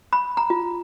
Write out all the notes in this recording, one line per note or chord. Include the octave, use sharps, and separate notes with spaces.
B5
A#5
F4